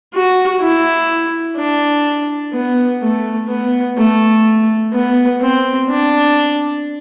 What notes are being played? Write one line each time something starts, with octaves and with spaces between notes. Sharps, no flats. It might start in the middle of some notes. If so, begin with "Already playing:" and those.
F#4
E4
D4
B3
A3
B3
A3
B3
C4
D4